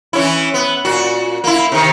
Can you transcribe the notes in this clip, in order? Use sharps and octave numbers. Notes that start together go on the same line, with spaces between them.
E3 C#4 E4
B3
A#2 F#4
A#3 E4
C3 D#3